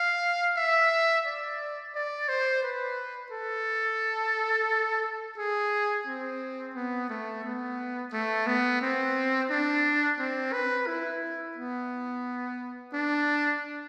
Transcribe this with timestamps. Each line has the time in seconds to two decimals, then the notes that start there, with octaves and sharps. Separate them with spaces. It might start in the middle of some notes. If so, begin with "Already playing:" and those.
Already playing: F5
0.57 E5
1.26 D5
1.95 D5
2.29 C5
2.63 B4
3.32 A4
5.38 G#4
6.07 C4
6.75 B3
7.10 A3
7.44 B3
8.13 A3
8.47 B3
8.82 C4
9.50 D4
10.19 C4
10.53 B4
10.87 E4
11.56 B3
12.93 D4